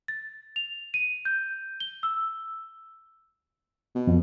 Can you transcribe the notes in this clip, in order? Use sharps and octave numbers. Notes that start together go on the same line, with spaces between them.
A6
F7
D#7
G6
G7
E6
B2
F2